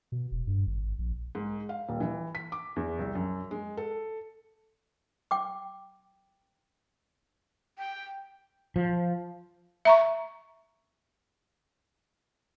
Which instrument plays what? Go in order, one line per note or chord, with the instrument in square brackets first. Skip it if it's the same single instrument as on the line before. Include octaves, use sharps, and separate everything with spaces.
[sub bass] B2
E1
G2
G#1
A#1
[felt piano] G#2
F5
D#1
E3
B6
D6
E2
C2
F#2
G#3
A4
[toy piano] G5 D6
[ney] G5
[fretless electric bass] F3
[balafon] E5 A#5 C#6